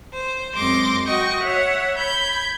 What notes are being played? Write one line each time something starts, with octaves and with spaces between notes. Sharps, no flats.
C5
F#2 G#3 C4 C6 D6 A#6
F#4 D#5 G5 C#6 A#6
C#5 E5 F#5
B5 G6 G#6